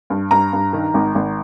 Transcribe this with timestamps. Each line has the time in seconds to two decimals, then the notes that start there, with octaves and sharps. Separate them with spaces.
0.10 G2
0.31 G2 A#5
0.53 G2
0.73 D#3
0.94 G#1
1.15 G#1